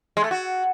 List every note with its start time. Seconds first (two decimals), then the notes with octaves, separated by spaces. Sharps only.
0.17 G#3
0.24 A3
0.31 F#4